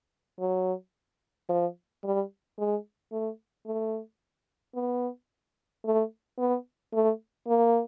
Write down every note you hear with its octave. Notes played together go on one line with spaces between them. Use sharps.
F#3
F3
G3
G#3
A3
A3
B3
A3
B3
A3
A#3